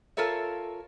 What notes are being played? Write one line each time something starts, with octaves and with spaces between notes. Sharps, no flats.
F4 A4 A#4 C#5 E5